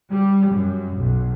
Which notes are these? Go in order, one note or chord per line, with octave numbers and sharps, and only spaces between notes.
G3
F#2
B1